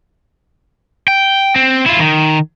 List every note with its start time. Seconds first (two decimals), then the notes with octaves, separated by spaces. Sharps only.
1.08 G5
1.56 C4
1.86 E4 F4
2.00 D#3